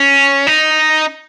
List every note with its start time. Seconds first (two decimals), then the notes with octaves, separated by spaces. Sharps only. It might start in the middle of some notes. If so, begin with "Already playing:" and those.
Already playing: C#4
0.47 D#4